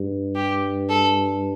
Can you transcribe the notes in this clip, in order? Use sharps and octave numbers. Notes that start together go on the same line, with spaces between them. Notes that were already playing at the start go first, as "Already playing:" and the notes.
Already playing: G2
G4
A4